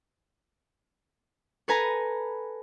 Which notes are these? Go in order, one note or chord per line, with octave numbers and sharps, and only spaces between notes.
A4 B4 G#5 A#5